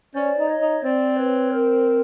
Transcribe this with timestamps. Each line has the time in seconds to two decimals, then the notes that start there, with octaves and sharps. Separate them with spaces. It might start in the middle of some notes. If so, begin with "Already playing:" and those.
0.15 C#4 C5 D5
0.39 D#4
0.50 C#5 D#5
0.61 D#4
0.84 C4 C5 D5
1.18 B4 C#5
1.53 A#4 C5